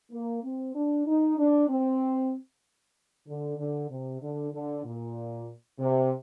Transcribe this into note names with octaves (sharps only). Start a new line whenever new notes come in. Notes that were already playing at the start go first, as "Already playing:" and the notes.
A#3
C4
D4
D#4
D4
C4
D3
D3
C3
D3
D3
A#2
C3